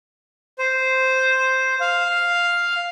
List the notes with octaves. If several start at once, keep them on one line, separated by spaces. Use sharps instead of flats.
C5
F5